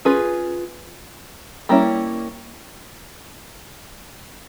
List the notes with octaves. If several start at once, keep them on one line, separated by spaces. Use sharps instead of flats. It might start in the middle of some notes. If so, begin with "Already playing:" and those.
C#4 F4 G#4 B4
G3 A#3 C#4 E4